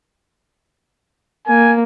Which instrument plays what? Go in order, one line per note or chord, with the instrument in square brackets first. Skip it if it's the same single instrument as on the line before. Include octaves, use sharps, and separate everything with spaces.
[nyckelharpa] A#3 [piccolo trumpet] G#5